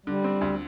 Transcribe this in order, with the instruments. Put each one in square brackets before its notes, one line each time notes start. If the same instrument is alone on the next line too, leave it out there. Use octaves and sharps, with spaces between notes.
[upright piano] D3 [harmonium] G3
[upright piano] C4
D2